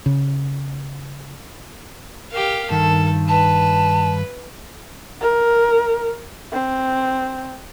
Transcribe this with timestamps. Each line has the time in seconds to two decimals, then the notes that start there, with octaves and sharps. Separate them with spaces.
0.06 C#3
2.32 G4 A#4 F5
2.70 G2 D#3 A4
3.28 B4 A5
5.21 A#4
6.53 C4